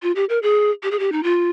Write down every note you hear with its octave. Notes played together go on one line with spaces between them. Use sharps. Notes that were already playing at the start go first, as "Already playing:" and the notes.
F4
G4
A#4
G#4
G4
G#4
G4
D#4
F4